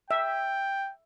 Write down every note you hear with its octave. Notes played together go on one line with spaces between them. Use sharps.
E5 G5